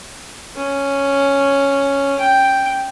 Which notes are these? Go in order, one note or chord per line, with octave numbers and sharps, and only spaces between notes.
C#4
G5